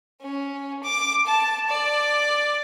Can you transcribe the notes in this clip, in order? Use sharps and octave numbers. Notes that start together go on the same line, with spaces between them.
C#4
D6
A5
D5